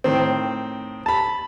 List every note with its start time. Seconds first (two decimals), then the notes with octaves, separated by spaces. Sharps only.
0.04 A2 D#3 C4
1.06 A5 B5